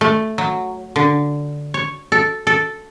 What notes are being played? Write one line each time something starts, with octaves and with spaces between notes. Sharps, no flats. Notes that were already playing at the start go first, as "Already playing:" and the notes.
A3
F#3
D3
C#5
A4
A4